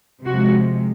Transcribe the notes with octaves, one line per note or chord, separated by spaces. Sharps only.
C3 F3 G#3 F#4